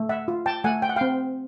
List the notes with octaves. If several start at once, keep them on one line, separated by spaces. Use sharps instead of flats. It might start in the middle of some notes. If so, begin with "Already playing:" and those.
Already playing: A3
E5 F#5
F4
G5 A5
A3 F#5 G#5
G5
F#5
C4 F5 G5